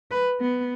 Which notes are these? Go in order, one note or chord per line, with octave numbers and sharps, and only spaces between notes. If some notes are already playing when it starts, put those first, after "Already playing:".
B4
B3